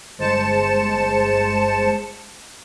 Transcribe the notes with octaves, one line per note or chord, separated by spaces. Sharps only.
G1 G#3 C5 A5 C#7 E7